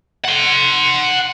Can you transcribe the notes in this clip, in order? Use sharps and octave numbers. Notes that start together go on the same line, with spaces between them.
F#5 C6